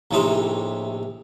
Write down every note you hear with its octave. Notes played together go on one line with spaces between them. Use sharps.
A#1 A2 C3 D#4 C5